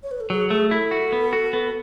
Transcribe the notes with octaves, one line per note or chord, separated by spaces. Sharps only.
C#5
B4
A4
F#3 G#4
A3 G#4
E4 A4
F#4
B3
F#4
B3